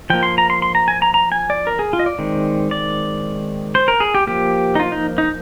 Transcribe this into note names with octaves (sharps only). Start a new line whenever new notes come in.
F3 A#3 G5
C6
A#5
C6
C6
A#5
G#5
A#5
A#5
G#5
D5
A#4
G#4
F4
D#5
D5
D#3 G#3 C4
D5
C5
A#4
G#4
G4
F3 A#3 G4
D#4
F4
D#4
D#4